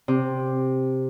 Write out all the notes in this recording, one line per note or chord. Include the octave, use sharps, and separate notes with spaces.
C3